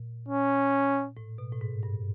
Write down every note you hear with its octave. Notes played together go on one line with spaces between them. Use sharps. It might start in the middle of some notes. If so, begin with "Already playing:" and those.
Already playing: A#2
C#4
A2
B2
A2
G#2
G2